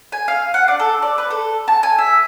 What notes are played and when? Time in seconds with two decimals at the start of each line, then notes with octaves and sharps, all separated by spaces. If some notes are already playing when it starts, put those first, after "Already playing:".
0.12 G#5
0.28 F5
0.54 F#5
0.68 D4
0.80 A4
1.02 D5
1.18 B4
1.30 A4
1.68 A5
1.83 G#5
1.98 E5